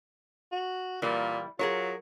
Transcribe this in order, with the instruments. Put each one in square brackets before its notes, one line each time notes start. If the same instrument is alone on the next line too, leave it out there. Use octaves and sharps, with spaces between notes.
[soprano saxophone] F#4
[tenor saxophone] A#2 [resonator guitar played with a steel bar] E3 G3 [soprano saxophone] A#3
[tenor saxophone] F#3 [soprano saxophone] F4 [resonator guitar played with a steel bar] G#4 A#4 C#5